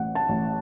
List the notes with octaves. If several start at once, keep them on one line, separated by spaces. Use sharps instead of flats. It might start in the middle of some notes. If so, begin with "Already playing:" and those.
Already playing: A1 F#5
A5
A1